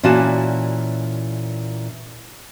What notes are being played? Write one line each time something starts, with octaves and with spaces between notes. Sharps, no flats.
A#2 E3 C#4 F#4 D5 A5